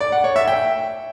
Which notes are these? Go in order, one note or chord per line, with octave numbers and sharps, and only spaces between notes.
D5
F#5
C#5
E5
G5